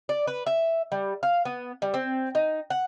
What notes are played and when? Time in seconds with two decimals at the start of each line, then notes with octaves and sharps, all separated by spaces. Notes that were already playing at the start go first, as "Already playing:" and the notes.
0.09 D5
0.27 B4
0.46 E5
0.92 G3
1.23 F5
1.45 B3
1.82 G3
1.94 C4
2.35 D#4
2.70 F#5